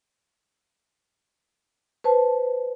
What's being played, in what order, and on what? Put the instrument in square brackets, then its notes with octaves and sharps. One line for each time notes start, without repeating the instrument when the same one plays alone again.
[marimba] B4 C5 A5